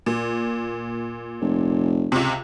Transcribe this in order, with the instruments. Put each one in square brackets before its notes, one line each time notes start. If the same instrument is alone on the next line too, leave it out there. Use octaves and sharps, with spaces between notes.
[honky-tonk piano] A#2
[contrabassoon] F1
[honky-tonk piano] C#2 C3